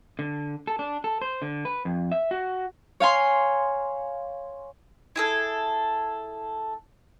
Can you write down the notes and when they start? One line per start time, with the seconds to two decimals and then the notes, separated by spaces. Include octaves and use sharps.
0.19 D3
0.67 A4
0.79 D4
1.04 A4
1.21 C5
1.42 D3
1.65 B4
1.85 F2
2.12 E5
2.31 F#4
3.00 C#5 F5 G#5 C6
5.16 E4 G#4 A4